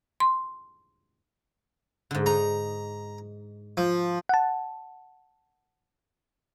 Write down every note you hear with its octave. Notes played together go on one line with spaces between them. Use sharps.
C6
G#2 D3
D#4 A#5
F3
F#5 A5